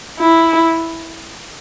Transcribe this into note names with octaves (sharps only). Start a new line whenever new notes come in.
E4